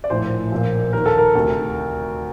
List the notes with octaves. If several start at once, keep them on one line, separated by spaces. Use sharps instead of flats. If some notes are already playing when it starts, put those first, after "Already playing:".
D5
A#1 A2 C5
A#1 A#2
D#2 D#3 A#4
A4
A#4
D2 C3 D#3